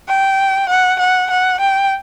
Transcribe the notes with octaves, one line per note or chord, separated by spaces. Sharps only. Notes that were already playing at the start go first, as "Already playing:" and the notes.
G5
F#5
F#5
F#5
G5